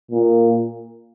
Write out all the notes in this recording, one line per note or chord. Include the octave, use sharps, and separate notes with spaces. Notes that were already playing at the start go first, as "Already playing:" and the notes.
A#2